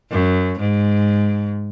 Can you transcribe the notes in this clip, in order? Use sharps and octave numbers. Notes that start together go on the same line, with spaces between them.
F#2
G#2